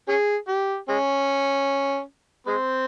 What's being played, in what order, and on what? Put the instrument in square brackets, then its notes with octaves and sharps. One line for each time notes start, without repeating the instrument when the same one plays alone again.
[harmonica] C#4 G#4
G4
G#3 C#4
G#3 C4